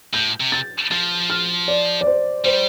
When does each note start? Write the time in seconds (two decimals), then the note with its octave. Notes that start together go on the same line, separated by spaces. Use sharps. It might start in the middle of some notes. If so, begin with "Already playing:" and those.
0.13 A2 G6
0.40 C3
0.52 A6
0.91 F3 A6
1.30 F6
1.68 D5
2.01 D5
2.07 C5
2.45 G3 C5